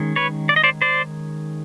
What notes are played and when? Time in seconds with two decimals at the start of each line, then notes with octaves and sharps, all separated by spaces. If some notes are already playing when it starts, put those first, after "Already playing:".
Already playing: D#3 G#3 C#4
0.16 B4 C#5
0.49 D5
0.56 D#5
0.64 C5 D5
0.82 C5 D5